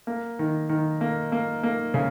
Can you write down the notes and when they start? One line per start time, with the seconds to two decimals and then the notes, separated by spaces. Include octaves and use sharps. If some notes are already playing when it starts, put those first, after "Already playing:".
0.07 A#3
0.39 D#3
0.69 D#3
1.01 A#3
1.32 A#3
1.63 A#3
1.94 C#3